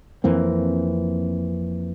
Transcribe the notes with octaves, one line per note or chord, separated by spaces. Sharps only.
F2 E3 A#3 C4